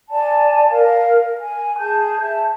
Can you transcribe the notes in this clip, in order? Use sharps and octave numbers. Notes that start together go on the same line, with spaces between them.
D5 G#5 A5
A#4 F5
G#5
G#4 A5 G6
E5 A5